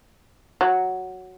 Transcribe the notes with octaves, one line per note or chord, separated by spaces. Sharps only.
F#3